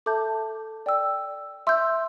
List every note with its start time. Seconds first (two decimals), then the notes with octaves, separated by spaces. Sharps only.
0.06 A4 E5 A5 D6 G6
0.86 D5 G5 E6
1.67 E5 C6 E6 G6